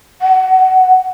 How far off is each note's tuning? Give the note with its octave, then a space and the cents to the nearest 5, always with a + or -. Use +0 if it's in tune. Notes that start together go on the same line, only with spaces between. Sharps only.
F#5 +20